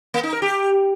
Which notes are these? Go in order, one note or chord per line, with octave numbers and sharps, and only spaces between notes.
A#3
D#4
A#4
G4